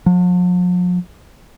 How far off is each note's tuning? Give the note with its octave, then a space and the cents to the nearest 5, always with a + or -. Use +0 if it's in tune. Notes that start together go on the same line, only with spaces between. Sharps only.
F3 +45